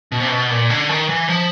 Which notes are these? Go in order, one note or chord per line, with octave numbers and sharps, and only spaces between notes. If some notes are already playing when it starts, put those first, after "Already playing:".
B2
C3
B2
A#2
D3
D#3
E3
F3